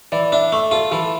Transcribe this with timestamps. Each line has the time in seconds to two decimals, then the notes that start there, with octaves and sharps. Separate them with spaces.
0.12 E3 D5
0.32 D4 E5
0.52 A3 E5
0.71 F4 A4
0.91 E3 A4